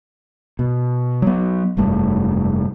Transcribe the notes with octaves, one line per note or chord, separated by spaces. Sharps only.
B2
F#3 B3
F1 G2 A3